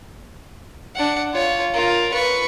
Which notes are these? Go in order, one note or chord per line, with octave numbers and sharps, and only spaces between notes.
D4 F#5
F4 C#5
F4 A#4
B4 C#6